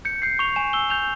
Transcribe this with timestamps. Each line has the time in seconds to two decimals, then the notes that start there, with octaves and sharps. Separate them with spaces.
0.05 G6 C#7
0.22 G6 C7
0.39 C#6 F7
0.56 G#5 E7
0.73 E6 G7
0.90 G6 F7